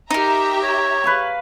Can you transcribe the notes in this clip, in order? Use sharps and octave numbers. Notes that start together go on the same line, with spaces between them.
D#4 G4 A#4 E5 A#5
C#5
B4 F5 C#6